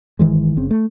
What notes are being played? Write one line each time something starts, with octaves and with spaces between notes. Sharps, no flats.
G1 D#3 E3 G#3
F#1 C#3 C4
A3